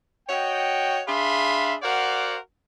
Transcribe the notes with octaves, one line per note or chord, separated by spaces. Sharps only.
F#4 C#5 D#5 G5
D4 G#4 E5 F5 B5 C6
F#4 A#4 C5 D5 F5 F#5